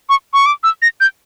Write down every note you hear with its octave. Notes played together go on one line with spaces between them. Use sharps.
C#6
C#6
D6
E6
A#6
G6